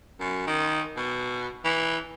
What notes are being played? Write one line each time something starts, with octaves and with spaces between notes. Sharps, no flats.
F#2
D#3
B2
E3